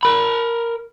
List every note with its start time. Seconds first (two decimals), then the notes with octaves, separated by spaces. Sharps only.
0.03 A#4 B5